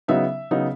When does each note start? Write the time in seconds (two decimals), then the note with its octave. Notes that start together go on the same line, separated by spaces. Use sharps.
0.08 C#3 F#3 B3 D#4 E5
0.51 C#3 F#3 B3 D#4